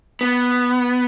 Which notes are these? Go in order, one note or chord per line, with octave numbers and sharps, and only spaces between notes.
B3